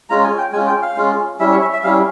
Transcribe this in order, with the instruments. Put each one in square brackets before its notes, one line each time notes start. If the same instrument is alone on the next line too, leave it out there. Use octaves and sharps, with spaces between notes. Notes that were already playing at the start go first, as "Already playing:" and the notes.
[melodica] G#3 C#4 F4 A#5
G#5
G5
G#3 G#5
C#4 F4
G5
F5
G#3 C#4 F4
G3 C#4 E4 E5
C#5
E5
E5
G3 C#4 E4 F5